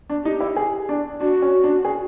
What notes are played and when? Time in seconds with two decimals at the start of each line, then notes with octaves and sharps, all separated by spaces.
0.10 D4
0.24 D#4 G4
0.41 E4
0.56 G#4
0.89 D4
1.21 D4 F#4
1.42 C#4
1.64 D4
1.85 G#4